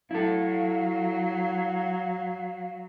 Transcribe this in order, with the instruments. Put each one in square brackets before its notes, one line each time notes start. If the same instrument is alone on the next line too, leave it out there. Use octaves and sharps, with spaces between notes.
[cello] F#3 [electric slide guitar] E4 A4 [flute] F5